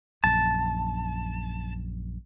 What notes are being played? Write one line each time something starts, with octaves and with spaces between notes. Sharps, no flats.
A#1 F#2 A5